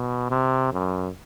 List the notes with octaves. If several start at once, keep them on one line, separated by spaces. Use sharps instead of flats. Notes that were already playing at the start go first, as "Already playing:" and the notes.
Already playing: B2
C3
F#2